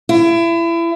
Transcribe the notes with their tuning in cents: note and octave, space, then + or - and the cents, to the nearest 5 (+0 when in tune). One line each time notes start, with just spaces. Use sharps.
E4 +30